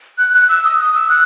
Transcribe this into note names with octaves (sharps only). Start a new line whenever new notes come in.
F#6
F#6
E6
D#6
D#6
E6
F#6